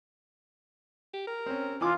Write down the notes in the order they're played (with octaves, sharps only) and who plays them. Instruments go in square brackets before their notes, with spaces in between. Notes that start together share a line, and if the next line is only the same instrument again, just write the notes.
[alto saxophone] G4
A#4
[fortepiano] C4 C#4
[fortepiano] E3 G#5 D6 [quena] F4